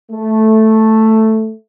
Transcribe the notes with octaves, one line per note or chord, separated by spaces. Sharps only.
A3